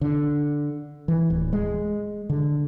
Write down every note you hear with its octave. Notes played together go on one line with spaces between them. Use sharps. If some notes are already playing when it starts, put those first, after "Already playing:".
D3
E3
D1
G#3
D3